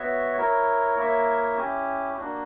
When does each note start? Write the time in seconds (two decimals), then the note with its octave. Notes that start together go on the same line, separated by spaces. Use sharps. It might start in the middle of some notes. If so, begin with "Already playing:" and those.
Already playing: B3 F#4 C#5 E5
0.38 E4 A#4 C#5
0.97 A#3 E4 A#4 C#5 E5
1.57 C#4 E4 G4
2.17 A#3 D4 F#4